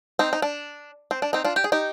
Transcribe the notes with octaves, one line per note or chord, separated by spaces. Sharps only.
C4 D#4
D#4
D4
C4
D4
C4 D#4
D4 F4
G4
G#4
D#4 G4